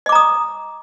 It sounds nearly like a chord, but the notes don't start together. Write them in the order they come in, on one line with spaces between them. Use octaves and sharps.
D#5 D6 A#5 D#6